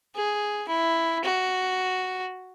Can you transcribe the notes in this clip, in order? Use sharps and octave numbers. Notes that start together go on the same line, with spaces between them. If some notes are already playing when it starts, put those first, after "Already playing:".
G#4
E4
F#4